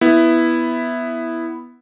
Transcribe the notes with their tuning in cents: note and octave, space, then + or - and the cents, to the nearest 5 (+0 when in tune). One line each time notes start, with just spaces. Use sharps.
B3 +0 E4 +0